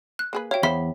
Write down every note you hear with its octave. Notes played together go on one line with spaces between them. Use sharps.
F#6
A#3 G#4 B4
F#4 C#5 E5 F5 G5
E2 C5 E5 F5 B5 B6 G7